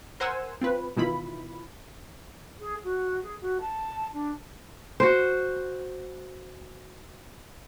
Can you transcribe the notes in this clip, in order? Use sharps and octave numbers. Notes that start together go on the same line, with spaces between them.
A#4 C5 F#5 G#5 C6 E6
C4 F4 B4
B2 D#3 E3 E4 F4 B5
G#4
F#4
G#4
F#4
A5
D4
F#4 C5